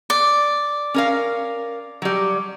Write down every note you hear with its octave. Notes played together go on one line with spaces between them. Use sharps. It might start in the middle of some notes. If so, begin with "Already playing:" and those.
D5
C#4 A#4 F5
F#3 G3